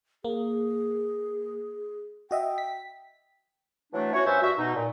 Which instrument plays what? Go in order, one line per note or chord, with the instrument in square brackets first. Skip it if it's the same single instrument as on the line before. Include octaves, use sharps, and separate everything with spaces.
[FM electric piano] A#3 [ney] G#4
[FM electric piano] F#4 D#5 E5 [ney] G5
[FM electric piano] B6
[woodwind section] E3 F#3 A3 D4
C#4 E4 F#4 C#5
G2 C#4 B4 C5 E5
G2 F#4 E5
B2 D#4
A#2